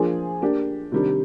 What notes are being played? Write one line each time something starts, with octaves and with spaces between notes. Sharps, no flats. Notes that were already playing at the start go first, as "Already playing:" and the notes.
Already playing: F3 A#3 D4 F4 G#4
A#3 D4 G4
C3 D#3 G3 D4